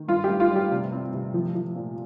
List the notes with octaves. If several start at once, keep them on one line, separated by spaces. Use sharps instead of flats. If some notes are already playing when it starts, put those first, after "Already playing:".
Already playing: D#3
G2 F4
G4
G2
F4
G3 G4
C3
C4
C3
F3
F3
A#2